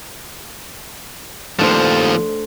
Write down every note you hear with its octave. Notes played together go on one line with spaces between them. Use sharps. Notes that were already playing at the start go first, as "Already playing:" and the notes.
D#2 F3 A3 D4 C5